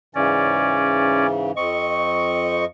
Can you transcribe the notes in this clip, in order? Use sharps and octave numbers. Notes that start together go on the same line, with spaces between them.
G#2 C#3 E3 C#4 D5
F2 C4 D#5 C#6